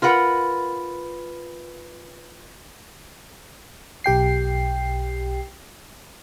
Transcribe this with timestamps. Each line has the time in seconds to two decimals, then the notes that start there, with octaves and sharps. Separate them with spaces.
0.02 F4 A#4 B4 F#5
4.04 B1 G4 G5 C7